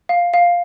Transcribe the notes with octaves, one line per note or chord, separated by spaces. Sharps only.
F5
F5